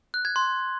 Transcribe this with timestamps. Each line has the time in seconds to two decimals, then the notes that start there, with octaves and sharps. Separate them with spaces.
0.14 F#6
0.25 G#6
0.36 C6